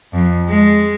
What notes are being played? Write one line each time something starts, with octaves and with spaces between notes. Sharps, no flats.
F2
G#3